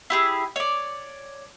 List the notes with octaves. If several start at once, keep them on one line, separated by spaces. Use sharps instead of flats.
E4 G4 G#4
C#5 D5